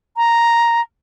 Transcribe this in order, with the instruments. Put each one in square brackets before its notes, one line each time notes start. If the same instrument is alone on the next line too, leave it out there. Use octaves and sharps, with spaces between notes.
[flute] A#5